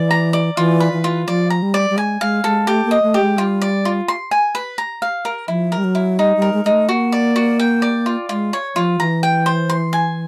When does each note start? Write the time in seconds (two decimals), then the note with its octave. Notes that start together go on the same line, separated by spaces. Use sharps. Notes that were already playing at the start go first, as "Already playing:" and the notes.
Already playing: E3 D5
0.11 A#5
0.33 D5
0.57 E3 F4
0.80 B4
0.93 E3
1.04 F4
1.28 F3 D5
1.50 A#5
1.62 G3
1.74 D5
1.90 G3
1.97 G#3 G#5
2.21 G#3 F5
2.44 G#3 A4
2.67 A3 G4
2.85 A#3
2.91 D#5
3.02 A3
3.14 G4
3.21 G#3
3.38 G3 F4
3.61 D5
3.85 F4
4.08 C6
4.31 G#5
4.55 B4
4.78 A#5
5.02 F5
5.25 A#4
5.48 F3 E4
5.72 A#4
5.77 G3
5.84 F#3
5.95 E4
6.19 G3 D#4
6.37 G3
6.42 A#4
6.53 G#3
6.65 G#3 D#4
6.71 A3
6.89 A#3 F#4
7.12 D5
7.36 F#4
7.60 G5
7.82 D5
8.06 F4
8.29 G#3 F4
8.53 C#5
8.76 F3 F4
9.00 E3 A#5
9.23 G5
9.46 C5
9.70 C6
9.93 G#5